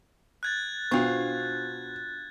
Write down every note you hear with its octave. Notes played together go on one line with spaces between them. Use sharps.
F#6 G#6 A6
B2 D4 F4 C5 C#6